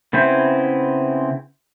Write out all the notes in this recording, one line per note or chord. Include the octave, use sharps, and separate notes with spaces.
C#3 B3 C4 E4 C5